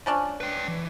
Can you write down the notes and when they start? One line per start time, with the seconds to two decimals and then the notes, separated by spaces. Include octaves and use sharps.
0.06 F3 C#4 D4
0.41 B4 G5
0.68 E3